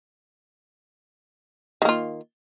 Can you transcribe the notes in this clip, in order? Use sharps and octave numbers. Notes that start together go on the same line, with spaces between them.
D#3 A#3 F4